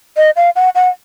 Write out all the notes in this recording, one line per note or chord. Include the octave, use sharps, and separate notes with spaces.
D#5
F5
F#5
F#5